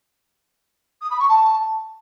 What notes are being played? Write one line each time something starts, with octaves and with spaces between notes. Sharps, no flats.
D#6
B5
C#6
A5